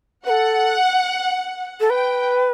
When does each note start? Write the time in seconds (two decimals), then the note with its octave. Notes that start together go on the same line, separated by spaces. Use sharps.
0.26 B4 F#5
0.30 A4
1.80 A4
1.89 B4 G5